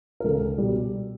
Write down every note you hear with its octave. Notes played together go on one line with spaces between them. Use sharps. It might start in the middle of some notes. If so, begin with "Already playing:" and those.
A#4
C#2 A4
B2 G3